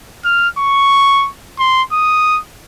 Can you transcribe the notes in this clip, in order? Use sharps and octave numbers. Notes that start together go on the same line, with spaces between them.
F6
C#6
C6
D#6